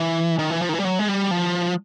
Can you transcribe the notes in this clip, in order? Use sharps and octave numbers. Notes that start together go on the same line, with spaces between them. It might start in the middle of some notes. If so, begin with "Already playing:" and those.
Already playing: E3
D#3
E3
F3
D#3
E3
G3
F#3
G#3
G3
F3